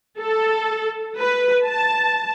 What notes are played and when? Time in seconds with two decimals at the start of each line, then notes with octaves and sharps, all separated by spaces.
0.19 A4
1.18 B4
1.65 A5